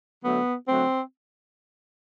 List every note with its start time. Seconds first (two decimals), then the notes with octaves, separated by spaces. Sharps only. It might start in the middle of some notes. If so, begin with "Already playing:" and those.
0.23 D3 F#3 A3 B3
0.68 D3 F#3 A3 C4